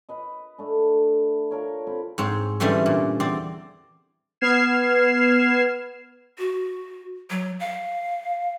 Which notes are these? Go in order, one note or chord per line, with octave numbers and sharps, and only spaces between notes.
A#4 B4 D#5
A3 D4
F4 A4 A#4 C#5
C4 A#4 B5
G#2 C4 C#5
D3 E3 G3 A3 C4 C#4
A#2
E2 C4 D5
B3 F6 G#6 C7 E7
F#4
F#3
F5